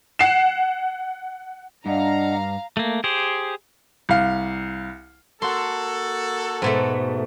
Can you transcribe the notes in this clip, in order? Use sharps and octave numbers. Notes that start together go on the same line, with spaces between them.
F#5 C7 E7
G2 D4 D#5 F5 F#5 A#5
A3 A#3
G4 G#4 C5
C2 F5
A#3 F#4 A4 C6
G#2 B2 A3